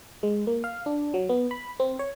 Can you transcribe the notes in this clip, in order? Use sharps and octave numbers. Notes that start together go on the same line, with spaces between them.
G#3
A#3
F5
D4
F#3
B3
B5
C4
C#5